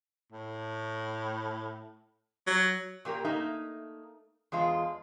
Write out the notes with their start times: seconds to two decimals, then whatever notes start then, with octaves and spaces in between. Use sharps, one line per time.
0.32 A2
2.47 F#3
3.05 A#2 A#3 G4 A#4
3.25 A3 A#3 D#4 E5
4.52 E2 G#3 F4 A5